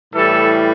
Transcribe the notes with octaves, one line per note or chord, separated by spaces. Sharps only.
A2 E3 G3 A4